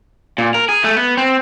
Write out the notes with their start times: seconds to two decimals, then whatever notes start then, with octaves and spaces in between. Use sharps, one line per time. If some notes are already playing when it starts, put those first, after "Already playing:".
0.38 A#2
0.55 A#4
0.69 G#4
0.84 A3
0.97 B3
1.17 C4